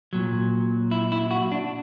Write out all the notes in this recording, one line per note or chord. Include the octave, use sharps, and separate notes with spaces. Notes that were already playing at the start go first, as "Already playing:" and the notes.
A#2 F#3
E4
E4
F#4
D4